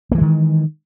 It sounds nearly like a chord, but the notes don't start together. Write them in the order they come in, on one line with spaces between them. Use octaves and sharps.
A#3 E3 G#3 D#3